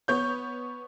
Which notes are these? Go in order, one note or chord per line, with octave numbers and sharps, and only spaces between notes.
B3 C#5 G6